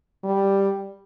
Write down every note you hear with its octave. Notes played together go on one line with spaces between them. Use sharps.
G3